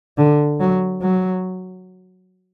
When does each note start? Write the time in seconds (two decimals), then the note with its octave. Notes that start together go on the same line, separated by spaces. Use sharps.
0.17 D3
0.60 F#3
1.01 F#3